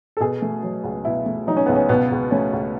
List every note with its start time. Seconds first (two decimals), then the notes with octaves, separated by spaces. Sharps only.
0.17 A4
0.20 B2 G#4
0.42 A3
0.63 F#3
0.84 C#2
1.05 B2 E4
1.26 A3
1.47 F#3 D#4
1.57 C#4
1.66 C#2 B3
1.76 C#4
1.89 B2 B3
2.11 C#2
2.31 A3 C#4
2.53 C#2